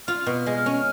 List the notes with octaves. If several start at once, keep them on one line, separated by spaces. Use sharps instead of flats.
F4 F6
B2
G#3
C#4